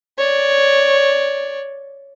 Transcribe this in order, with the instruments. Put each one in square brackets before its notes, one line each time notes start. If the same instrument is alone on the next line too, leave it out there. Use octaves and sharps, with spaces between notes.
[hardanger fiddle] C#5 D5